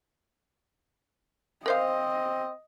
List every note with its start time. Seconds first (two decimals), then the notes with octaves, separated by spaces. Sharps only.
1.66 C4 A#4 C5 D#5 F5